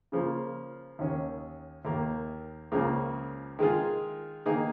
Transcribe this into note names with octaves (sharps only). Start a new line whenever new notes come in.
C#3 F3 A#3
D#2 D#3 C#4
D#2 D#3 A#3
C#2 C#3 F3 A#3
D#3 G#3 F4 G#4
D#3 A#3 D#4 G#4